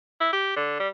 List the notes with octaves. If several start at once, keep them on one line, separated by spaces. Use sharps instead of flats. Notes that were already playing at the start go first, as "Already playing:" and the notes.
E4
G4
D3
G3